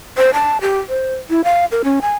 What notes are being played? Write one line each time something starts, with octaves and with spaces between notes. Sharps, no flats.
C5
A5
G4
C5
E4
F5
A#4
C#4
G#5